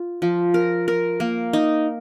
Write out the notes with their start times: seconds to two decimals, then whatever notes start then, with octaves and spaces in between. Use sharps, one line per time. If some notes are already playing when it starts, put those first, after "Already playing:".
Already playing: F4
0.22 F3
0.54 A#4
0.88 A#4
1.20 A#3
1.53 D#4